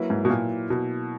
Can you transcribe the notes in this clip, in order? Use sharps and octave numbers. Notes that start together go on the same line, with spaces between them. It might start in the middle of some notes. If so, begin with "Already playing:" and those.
Already playing: F#3 A#3 E4 B4
G#2
B2
A#2
B2